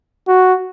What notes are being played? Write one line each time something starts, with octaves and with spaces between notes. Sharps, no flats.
F#4